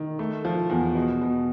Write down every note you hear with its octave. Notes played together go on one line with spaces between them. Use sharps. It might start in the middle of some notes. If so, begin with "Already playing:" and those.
Already playing: D#3
A3
F3
E2
B2
B2